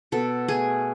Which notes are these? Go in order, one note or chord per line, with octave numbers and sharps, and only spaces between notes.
B2 A4
A3 G#4